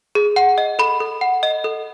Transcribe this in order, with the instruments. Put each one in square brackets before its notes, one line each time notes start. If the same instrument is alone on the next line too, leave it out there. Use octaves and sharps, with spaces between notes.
[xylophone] G#4
F#5
D#5
A4 B5
A4
F#5
D#5
A4